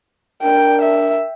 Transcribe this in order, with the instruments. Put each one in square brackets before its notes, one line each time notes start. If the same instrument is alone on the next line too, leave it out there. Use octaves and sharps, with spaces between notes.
[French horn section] D4 A#4 [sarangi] G5
[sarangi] E5